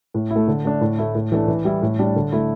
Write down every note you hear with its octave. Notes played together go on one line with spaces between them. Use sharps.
A2
E4
A3
D3
A3 D4
A2
A3 E4
A2
E3 A3 D4
E3
G3 E4
A2
G3 D4
D3
A3 E4